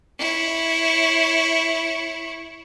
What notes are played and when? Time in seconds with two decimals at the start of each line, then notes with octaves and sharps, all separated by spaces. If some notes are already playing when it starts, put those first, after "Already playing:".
0.19 E4 C#5